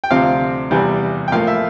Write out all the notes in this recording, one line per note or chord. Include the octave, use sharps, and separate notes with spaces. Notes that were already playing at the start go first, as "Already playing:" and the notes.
G5
D2 C3 F3 C4 F5
E2 C3 E3 G3
G5
A2 F3 A#3 F5
E5